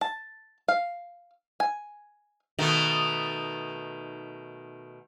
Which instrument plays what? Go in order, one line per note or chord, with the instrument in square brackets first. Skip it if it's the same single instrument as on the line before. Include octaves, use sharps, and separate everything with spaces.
[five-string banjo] A5
F5
G#5
[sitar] B2 D#3 A3